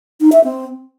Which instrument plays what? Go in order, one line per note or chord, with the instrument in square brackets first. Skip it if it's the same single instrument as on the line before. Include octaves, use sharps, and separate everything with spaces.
[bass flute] D#4
E5
C4